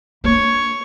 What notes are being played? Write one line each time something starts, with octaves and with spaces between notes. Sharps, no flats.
A#3 D4 C#5